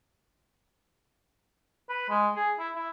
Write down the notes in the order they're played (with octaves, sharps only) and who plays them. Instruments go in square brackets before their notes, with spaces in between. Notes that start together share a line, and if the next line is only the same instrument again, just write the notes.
[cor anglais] B4
G#3
G#4
E4
E4